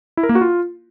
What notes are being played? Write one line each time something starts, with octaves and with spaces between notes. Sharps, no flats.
E4
A#4
A#3
F#4
F4